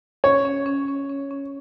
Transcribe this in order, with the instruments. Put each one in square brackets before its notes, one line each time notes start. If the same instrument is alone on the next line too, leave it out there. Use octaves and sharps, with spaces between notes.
[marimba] C#4 [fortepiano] C#5
[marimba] C#4
C#4
C#4
C#4
C#4